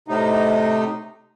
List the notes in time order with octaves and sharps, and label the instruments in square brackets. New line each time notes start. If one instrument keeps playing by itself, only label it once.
[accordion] A2 C3 D#4